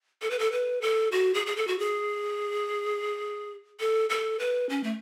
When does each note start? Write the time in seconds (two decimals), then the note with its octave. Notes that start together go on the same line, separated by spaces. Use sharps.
0.22 A4
0.31 B4
0.39 A4
0.52 B4
0.82 A4
1.12 F#4
1.34 G#4
1.47 G#4
1.56 A4
1.68 F#4
1.79 G#4
3.80 A4
4.10 A4
4.39 B4
4.70 C#4
4.84 A3